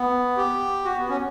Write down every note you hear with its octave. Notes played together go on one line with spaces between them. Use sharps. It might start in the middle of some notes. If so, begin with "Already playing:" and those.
Already playing: B3
G4
F#4
B3
C#4